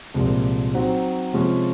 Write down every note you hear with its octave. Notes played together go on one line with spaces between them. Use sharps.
C2 A#2 F3 G#3
F#3 C4 D#4 F#4 C5
C3 F3 G#3 C#4 F4